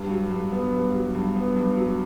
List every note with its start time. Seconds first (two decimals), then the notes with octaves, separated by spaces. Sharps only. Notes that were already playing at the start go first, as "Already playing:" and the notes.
Already playing: G2
0.10 F#3
0.31 G2
0.52 B3
0.73 G2
0.94 F#3
1.15 G2
1.36 B3
1.56 G2
1.77 F#3